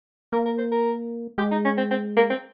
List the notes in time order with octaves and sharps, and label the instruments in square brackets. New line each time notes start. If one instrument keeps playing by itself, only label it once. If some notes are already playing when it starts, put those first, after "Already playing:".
[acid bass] A#3 [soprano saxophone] A#4
[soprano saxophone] A#4
C5
A#4
[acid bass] G#3 [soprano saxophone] G4
[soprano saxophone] D#4
C#4
C4
C4
A#3
C4